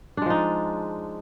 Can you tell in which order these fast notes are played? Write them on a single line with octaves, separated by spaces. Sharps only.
D4 G#3 F3 D#4